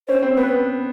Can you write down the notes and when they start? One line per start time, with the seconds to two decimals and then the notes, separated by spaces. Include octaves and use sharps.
0.08 C#4 C5
0.22 C4
0.37 B3 B4